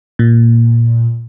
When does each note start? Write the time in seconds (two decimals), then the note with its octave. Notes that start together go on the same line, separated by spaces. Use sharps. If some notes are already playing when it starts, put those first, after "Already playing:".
0.19 A#2